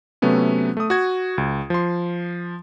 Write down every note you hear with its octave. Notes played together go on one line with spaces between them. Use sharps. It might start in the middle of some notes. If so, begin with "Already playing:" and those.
C3 F#3 A3 B3 C#4
A3 D#6
F#4 G#6
C#2
F3 C6